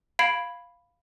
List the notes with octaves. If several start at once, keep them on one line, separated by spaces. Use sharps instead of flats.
F5 B5 G#6 C7 D7 F#7